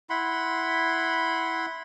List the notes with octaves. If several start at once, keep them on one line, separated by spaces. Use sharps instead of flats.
E4 F#5 B5 C6